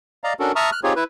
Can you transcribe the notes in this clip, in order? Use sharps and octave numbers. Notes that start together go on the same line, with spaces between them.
D5 D#5 F5 A#5
C#4 D4 F#4 A4 A#4
E5 A5 A#5 C#6 D#6 F6
F6 F#6
C4 D#4 F4 G4 G#4 C#5
E4 B4